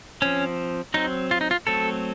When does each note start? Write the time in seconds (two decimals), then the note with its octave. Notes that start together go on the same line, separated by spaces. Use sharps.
0.22 F3 C4 C#4
0.94 F#3 C4 D#4
1.31 F4
1.41 D#4
1.51 F4
1.67 F#3 A3 C4 A4